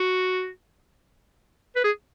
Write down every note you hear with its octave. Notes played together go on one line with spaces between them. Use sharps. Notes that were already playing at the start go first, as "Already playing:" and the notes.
Already playing: F#4
B4
G#4